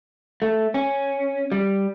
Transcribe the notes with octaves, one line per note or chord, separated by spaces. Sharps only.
A3
C#4
G3